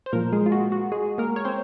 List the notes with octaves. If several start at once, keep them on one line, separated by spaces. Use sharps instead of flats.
C5
A#2 F3 A#3 A#4
G#3 G#4
F4
F#4
F#4
G#3 G#4
A#3 A#4
C#5
C4 C5